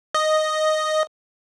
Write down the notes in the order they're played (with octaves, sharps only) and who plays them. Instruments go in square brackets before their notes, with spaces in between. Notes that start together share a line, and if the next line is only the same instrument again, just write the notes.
[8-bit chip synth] D#5